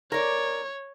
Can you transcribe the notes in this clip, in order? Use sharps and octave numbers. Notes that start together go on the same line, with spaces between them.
A#4 C#5 D5